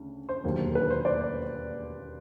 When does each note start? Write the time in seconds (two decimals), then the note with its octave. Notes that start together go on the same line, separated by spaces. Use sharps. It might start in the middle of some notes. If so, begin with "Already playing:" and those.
Already playing: D2 C#3
0.29 C5
0.44 E1 D#2 D3 F#3 A#3
0.75 B4
0.91 C5
1.05 C5 D5